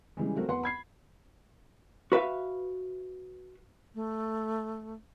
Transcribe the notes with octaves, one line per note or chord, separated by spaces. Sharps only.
C#3 E3 G3 G#3
F#3 A3 C4 F#4 A#4
E2 B4 F#5 C6
B5 G#6 C7
F#4 B4 E5 F5
A3